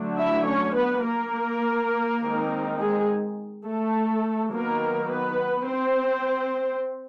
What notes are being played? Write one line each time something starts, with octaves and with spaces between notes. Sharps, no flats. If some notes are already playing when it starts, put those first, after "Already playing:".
Already playing: D3 F#3 A3 D4
E4 E5
C#4 C#5
B3 B4
A#3 A#4
D#3 G#3 C4 D#4
G#3 G#4
A3 A4
D#3 F#3 A#3 B3 D#4 A#4
B3 B4
C4 C5